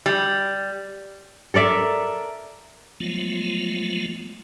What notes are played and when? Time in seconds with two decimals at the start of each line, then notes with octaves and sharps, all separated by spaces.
0.06 G3
1.54 A4 A#4 D5 E5
3.00 F3 F#3 G#3 A3 B3 F4